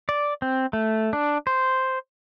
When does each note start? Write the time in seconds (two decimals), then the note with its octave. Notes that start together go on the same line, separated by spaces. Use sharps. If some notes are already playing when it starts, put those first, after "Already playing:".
0.09 D5
0.42 C4
0.73 A3
1.13 D4
1.47 C5